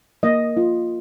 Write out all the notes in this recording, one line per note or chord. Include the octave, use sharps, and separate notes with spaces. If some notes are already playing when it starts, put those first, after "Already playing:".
A#3 D#5
F4